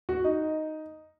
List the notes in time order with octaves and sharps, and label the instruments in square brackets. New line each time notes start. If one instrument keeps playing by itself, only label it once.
[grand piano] F#4
D#4